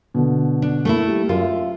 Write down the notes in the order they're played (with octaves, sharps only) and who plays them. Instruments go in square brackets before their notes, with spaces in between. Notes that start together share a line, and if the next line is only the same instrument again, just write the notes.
[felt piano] B2 D3
[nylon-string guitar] D4
A3 A#3 E4
[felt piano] G3
[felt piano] F#2 [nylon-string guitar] F4
[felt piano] E5